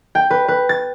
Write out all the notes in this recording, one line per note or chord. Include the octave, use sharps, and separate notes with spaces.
G5
B4
B4
A6